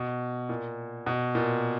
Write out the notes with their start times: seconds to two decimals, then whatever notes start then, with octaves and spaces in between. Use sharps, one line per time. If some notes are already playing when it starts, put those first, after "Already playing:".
Already playing: B2
0.49 A#2
1.06 B2
1.35 A#2